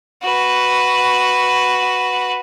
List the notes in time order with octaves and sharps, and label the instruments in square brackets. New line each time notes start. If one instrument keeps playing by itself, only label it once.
[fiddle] F#4 B4